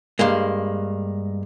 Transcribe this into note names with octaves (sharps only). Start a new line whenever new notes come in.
G2 G#3 A#3